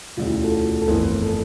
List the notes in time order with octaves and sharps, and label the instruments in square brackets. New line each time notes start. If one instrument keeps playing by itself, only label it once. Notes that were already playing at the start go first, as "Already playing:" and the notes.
[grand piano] E1 D2 C#3 [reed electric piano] F4
[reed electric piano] E4
F4
A4
A4
[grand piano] G1 F2 E3 A3 E4 [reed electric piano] A#4
[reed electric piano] A4